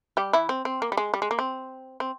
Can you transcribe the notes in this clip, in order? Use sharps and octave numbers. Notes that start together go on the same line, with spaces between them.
G3 G4
E3 E4
C4
C4
A#3
G3
G#3
G3
G#3
A#3
C4
C4